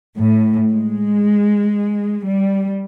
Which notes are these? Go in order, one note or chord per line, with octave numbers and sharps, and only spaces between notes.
A2
G#3
G3